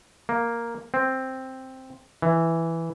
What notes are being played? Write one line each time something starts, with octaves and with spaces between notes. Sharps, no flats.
A#3
C4
E3